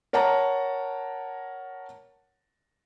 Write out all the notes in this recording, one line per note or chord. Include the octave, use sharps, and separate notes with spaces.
A#4 C#5 F#5 A5 A#5